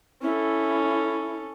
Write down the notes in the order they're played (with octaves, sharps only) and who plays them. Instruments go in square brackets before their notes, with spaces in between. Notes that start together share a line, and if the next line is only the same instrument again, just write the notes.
[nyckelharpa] C#4 A4 [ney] E4